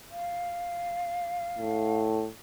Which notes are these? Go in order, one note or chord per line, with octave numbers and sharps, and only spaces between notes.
F5
A2